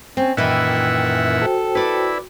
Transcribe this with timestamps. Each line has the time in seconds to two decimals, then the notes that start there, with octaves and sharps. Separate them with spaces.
0.17 C4 C#4
0.37 F#2 A#2 D#3 E3 E4 E5 F#5 G5
1.42 F#4 A4 C5 G5
1.75 E4 B4 D5